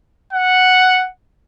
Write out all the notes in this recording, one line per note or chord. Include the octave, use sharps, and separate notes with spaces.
F#5